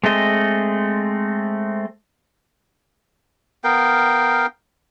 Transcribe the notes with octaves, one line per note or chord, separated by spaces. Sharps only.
G#3 A3 C4 D#5
B3 A#4 F5 G5